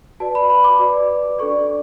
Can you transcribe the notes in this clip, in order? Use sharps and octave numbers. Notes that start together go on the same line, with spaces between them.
F#4 B4 D5 A5
B5
B5
D6
F#4 B4 D5
D4 A4 D5 C#6